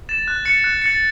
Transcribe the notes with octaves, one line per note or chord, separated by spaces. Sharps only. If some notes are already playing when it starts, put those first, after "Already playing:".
A6 E7
F#6
A6 C#7
F#6
A6 C#7